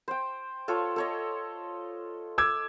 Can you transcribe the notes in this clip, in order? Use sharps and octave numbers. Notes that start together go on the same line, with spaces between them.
C5 G5
F4 A4 C#5
A4 C#5 D#5
D6 E6 G#6